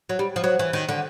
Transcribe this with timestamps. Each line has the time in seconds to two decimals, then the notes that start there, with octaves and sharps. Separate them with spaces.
0.09 F#3
0.19 G3
0.36 F3
0.44 F#3
0.59 E3
0.73 D#3
0.89 D3